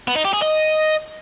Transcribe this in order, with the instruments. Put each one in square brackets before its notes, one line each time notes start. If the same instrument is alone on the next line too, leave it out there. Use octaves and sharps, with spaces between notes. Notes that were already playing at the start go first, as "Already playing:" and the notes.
[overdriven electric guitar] B3
D#4
G4
G#4
D#5